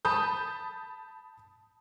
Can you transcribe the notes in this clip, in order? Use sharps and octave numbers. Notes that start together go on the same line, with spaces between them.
A5 B5 D#6 G6